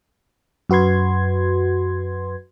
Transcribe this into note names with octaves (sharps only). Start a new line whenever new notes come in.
F#2 F#4 B4 C6 G#6